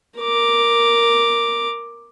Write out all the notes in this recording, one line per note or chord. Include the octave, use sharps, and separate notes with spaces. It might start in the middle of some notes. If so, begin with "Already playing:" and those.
A#4 D6